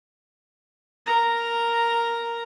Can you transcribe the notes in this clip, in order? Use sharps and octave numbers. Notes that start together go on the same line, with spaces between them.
A#4 A#5